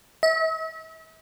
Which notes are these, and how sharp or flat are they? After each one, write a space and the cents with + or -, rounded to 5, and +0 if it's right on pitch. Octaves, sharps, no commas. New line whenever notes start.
E5 -45